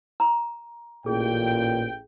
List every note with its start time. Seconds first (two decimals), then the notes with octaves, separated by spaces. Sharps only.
0.20 A#5
1.06 A1 A#2 G#4 G5